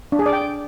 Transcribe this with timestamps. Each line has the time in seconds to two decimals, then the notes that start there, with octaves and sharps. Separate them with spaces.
0.12 D4
0.19 G#4
0.26 D5
0.33 G5